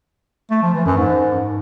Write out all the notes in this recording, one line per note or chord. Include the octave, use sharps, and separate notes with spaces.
A3
F3
E3
F#2
G#2